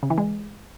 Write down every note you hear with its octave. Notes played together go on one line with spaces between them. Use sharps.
C#3
E3
G#3